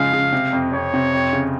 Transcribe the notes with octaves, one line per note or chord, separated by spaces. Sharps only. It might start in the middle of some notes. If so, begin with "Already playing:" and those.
Already playing: C#3 F3 G#3 F5
C#3
C3
F2
F2 C#5
C3
F2
C#3